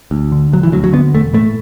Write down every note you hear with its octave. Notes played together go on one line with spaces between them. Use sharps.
D2
D3
E1 F#3
E3
D2 F#3
F#3
D3 B3
E1 A3
A2 A3